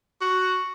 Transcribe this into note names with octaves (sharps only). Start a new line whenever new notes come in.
F#4